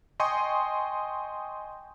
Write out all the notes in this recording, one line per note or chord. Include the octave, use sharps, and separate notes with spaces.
D#5 G5 G#5 C6 C#6 D#6